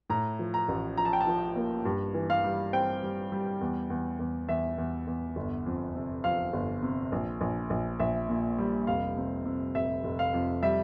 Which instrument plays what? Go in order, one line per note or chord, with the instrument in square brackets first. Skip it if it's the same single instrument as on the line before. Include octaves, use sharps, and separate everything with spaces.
[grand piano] A2 A#5
F3
A#5
A1
F3 A#5
A5
G5
A5
F3
A#3
G2
E3
F5
G3
C4 G5
G3
G3
E2
E2
E2
E2 E5
E2
E2
G1
F2
C3
F2 F5
G1
C3
A#1
A#1
A#1
A#1 E5
A#2
G3
F1 F5
C3
C3
F1 E5
F1
F5
F2
G3 E5